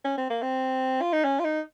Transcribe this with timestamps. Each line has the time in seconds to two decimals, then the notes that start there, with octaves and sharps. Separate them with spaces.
0.05 C#4
0.18 C4
0.30 A#3
0.43 C4
1.02 F4
1.13 D#4
1.24 C#4
1.40 F4
1.44 D#4